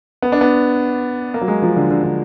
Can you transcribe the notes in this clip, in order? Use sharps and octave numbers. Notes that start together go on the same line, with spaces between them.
B3
D4
B3
A#3
F#3
G#3
F3
D3
D3
D3